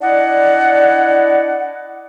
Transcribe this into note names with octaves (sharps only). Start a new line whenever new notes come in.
D4 E4 D5 D#5 F#5